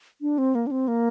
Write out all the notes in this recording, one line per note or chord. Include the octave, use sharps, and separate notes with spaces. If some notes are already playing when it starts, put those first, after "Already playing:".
D4
C4
A#3
D4
C4
A#3